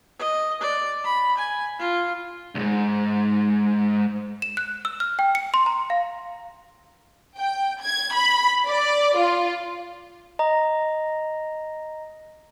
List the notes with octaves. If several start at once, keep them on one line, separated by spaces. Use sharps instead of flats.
D#5
D5
B5
G#5
F4
C#2 G#2
E7
F#6
E6
F6
G5
C#7
C6
A#5
F5
G5
G#6
B5
D5
F4
D#5 A#5